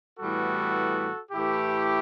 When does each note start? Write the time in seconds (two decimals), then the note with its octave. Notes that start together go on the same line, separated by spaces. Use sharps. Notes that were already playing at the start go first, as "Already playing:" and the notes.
0.20 A2 E3 G3 B3 F#4 A4
1.32 A2 E3 A3 E4 G4